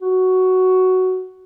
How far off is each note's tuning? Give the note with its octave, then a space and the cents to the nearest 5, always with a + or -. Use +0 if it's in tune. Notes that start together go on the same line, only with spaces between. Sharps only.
F#4 +5